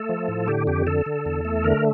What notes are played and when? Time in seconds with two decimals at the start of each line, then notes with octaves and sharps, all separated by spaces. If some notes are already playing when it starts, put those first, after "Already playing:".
Already playing: A3 A4
0.09 F3
0.29 A2
0.48 D3 G4
0.67 F2 G4
0.87 D3 A4
1.06 D3
1.26 E2
1.45 A3
1.64 D3 A#4